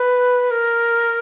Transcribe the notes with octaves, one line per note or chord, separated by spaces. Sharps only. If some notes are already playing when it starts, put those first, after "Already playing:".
Already playing: B4
A#4